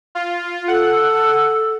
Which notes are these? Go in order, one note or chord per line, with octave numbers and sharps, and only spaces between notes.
F4
A4 F#5